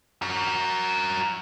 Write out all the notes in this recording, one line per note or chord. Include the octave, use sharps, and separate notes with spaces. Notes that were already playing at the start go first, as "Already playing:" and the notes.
F#4 A#4